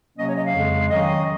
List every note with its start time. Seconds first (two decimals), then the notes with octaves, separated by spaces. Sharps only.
0.17 C3 F#3 A#3 C#4 D#5
0.27 C#5
0.36 D#5
0.45 F5
0.54 F2 C#3 G#3
0.91 D#3 F#3 C#4 D#5